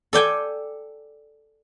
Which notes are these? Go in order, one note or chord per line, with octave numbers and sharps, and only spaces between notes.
A4 D5 G5 G#5